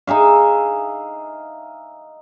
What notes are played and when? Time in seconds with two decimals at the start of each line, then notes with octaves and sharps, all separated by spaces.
0.07 D#4 G#4 E5 F5